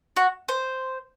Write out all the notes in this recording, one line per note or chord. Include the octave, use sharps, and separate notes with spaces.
F#4
C5